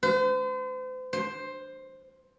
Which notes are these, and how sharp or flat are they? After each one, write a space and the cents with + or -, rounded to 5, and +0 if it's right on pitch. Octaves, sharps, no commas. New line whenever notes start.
C5 -40
C5 +10